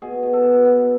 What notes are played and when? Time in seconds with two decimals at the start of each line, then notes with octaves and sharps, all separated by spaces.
0.02 B2 G#4
0.23 B2
0.33 A4
0.44 B2
0.65 B3